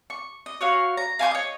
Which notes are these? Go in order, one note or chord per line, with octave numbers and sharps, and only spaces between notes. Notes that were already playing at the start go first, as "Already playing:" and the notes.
C#6
D#5
F#4 C#5 F5
A#5
F5 G#5 C#6 G6
C#5 D#5